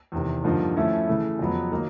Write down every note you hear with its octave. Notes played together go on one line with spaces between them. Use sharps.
E2 C3 D#3
G2 D3 F3 A#3 D#4
F3 A3 C#4 E4
C#3 E3 A3
F2 C#3 F#3 B3
D#3 F#3 A#3 D#4